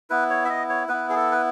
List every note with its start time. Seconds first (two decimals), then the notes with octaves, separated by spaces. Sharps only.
0.10 B3 E4 B4
0.30 C#5
0.45 E5
0.50 D#5
0.69 C#5
0.89 B3 E4 B4
1.10 G#4
1.16 A4
1.32 B4